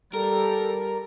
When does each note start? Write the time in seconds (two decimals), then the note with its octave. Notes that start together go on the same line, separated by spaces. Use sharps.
0.13 G3 A4 A#4